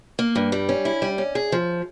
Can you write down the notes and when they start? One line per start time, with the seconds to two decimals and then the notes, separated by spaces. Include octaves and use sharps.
0.19 A#3
0.35 G2
0.52 G3
0.69 C#4
0.85 E4
1.02 G3
1.18 C#4
1.35 G#4
1.52 F3